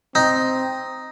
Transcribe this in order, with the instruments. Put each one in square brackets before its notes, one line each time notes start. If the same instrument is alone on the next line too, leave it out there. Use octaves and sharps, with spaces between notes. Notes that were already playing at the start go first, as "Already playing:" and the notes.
[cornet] C4 [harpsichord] D#4